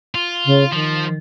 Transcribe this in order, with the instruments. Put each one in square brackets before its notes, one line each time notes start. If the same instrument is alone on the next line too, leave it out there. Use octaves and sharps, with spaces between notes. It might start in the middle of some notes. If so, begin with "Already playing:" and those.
[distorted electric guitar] F4
[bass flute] C#3
[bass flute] D#3 [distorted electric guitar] F3